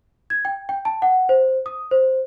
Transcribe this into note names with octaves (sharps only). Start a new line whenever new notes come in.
G#6
G5
G5
A5
F#5
C5
D#6
C5